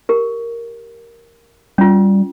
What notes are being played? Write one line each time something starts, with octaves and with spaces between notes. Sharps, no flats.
G4 A#4
G3 C#4 F4